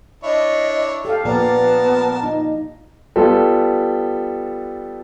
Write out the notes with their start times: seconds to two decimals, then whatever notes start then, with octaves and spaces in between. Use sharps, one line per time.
0.23 D4 E4 C#5 D#5
1.05 G4 A4 F5
1.25 A#2 F3 B3 A#4 B4 D5 A5
2.23 D#4
3.16 G3 B3 F4 A4